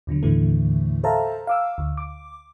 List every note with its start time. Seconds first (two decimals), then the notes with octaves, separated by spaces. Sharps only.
0.07 D#2 B2 D3 F#3
0.23 D#2 A2 D3 E3 A3
1.04 A4 C5 E5 F5 A5 A#5
1.47 F5 D6 E6
1.78 D2
1.97 D6